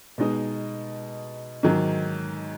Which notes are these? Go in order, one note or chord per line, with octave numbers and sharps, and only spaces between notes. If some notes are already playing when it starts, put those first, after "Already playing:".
B2 G#3 D#4
G#2 D#3 F#3